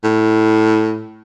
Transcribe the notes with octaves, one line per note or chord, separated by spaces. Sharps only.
A2